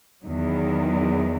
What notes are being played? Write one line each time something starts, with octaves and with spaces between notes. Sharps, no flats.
E2 D#3 F#3